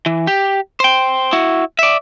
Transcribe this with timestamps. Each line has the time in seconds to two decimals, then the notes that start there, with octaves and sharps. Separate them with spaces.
0.06 E3
0.27 G4
0.80 C5 G5
1.33 E4 F#4
1.79 D5 E5